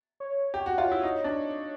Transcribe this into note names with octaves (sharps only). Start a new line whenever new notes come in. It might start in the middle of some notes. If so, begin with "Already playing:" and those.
C#5
G4
F#4
F4
E4
D#4
D4